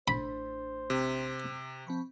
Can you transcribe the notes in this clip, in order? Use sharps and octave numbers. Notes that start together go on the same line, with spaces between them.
A1 A3 D4 C5 B5
C3
F3 C4 B5 C#6